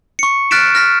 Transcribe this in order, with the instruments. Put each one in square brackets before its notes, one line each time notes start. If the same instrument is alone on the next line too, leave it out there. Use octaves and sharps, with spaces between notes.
[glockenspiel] C#6 C#7
F6 F#6 A6 B6 D7 E7
F6 A#6 B6